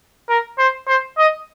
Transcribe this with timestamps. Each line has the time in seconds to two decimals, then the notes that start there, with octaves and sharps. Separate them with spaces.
0.29 A#4
0.59 C5
0.88 C5
1.18 D#5